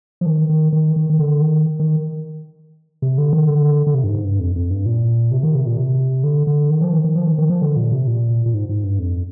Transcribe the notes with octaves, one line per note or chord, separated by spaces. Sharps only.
F3
D#3
D#3
D#3
D#3
D#3
D3
D#3
D#3
C3
D3
D#3
D3
D3
C3
G2
G#2
G2
F2
F2
G2
A#2
C3
D#3
C3
A#2
C3
D3
D3
D#3
F3
D#3
D#3
F3
D#3
D#3
F3
D3
A#2
C3
A#2
A#2
G#2
G#2
G2
F2